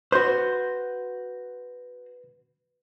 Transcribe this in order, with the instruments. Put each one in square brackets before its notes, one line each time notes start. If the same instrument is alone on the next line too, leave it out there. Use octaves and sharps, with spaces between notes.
[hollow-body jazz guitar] F#4 C5 [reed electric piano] B4 G6